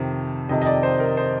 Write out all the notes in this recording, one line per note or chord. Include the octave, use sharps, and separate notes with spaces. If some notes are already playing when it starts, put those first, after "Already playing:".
Already playing: F2 C3 D#3
F2 C3 D#3 D#5
D#5
D5
C5
A#4
C5